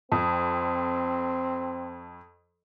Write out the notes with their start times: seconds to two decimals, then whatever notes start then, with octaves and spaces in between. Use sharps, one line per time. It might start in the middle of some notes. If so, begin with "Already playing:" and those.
0.12 F2 C4